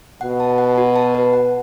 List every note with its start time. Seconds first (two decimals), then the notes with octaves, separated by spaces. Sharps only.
0.21 B2 F#5
0.40 A5
0.58 F#5
0.78 F#4
0.96 A5
1.15 B4
1.33 F#5